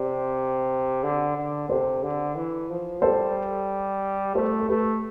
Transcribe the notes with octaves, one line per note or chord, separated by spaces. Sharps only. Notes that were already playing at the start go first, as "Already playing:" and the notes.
Already playing: C3 D5
D3
D3
C3 A4 C5
D3
E3
F3
G3 A4 C5
A3 A4 C5
A4
A3 G4 B4